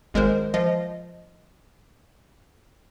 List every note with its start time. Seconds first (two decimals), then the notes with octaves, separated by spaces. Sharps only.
0.14 G#1 G#3 A#4 C5
0.54 F3 D#5